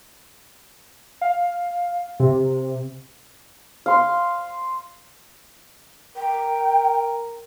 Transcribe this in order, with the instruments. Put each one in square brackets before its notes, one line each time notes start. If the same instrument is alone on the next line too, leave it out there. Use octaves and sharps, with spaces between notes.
[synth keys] F5
C3
[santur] F5 C6
[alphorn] A#4 [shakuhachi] G5